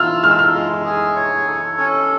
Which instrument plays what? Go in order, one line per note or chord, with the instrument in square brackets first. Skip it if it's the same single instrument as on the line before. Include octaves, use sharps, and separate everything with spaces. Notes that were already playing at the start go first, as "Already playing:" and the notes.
Already playing: [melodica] F4 [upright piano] E6 F6
[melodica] G#3 [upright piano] F6
[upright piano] E6
F6
[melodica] G#3
G#4
C#5
A4
C#4